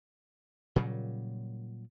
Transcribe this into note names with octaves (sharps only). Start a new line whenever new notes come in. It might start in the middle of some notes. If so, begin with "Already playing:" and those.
A#2 C#3 F#3 G3